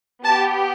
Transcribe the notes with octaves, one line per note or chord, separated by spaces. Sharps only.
B3 G4 A5